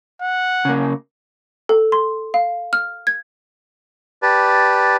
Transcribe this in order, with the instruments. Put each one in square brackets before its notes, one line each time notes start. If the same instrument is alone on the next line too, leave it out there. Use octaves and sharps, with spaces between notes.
[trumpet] F#5
[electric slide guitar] C#3 A#3
[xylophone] A4
C6
F5
F6
G#6
[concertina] G4 B4 D5 A5